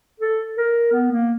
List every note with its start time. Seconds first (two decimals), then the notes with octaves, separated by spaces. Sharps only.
0.20 A4
0.57 A#4
0.92 B3
1.12 A#3